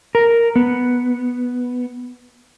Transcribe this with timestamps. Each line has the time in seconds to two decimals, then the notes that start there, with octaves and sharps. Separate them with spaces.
0.15 A#4
0.56 B3